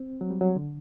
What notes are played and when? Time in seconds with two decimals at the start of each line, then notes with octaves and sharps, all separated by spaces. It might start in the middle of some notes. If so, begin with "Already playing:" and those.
Already playing: C4
0.21 F#3
0.31 G3
0.41 F#3
0.56 D3